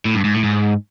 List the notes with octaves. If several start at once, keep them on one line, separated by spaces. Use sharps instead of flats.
A2
G2
G#2
A2
G#2